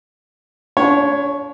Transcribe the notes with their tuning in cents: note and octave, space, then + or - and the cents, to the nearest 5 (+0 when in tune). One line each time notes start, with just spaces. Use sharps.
D4 -40 C#5 +0